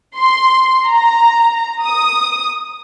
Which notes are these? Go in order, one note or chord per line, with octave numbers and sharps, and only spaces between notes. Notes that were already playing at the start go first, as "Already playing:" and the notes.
C6
A#5
D#6